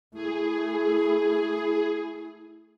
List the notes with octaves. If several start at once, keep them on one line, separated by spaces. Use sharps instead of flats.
A3 E4 G#4